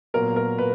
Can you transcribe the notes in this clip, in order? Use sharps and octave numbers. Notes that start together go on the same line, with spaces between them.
A#2 F#3 B3 A#4
A#4
A#2 B4